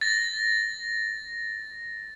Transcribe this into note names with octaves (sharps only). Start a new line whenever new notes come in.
A6 A#6